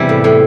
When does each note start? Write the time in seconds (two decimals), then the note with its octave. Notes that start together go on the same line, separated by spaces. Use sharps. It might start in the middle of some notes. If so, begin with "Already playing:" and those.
Already playing: E2 C3 G3 E4
0.09 A2
0.24 A2